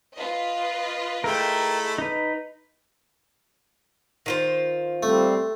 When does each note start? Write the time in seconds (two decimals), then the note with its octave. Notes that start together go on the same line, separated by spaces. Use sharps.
0.14 F4 B4 D#5
1.24 G#3 A3 E4 A#4 G5
1.98 D#4 B4
4.26 D#3 F4 C5
5.03 G3 A3 C4